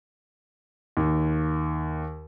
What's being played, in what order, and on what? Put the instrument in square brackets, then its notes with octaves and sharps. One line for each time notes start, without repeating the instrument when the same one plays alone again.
[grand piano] D#2